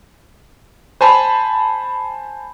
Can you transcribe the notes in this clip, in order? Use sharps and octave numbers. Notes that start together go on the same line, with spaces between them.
C5 G#5 A5 B5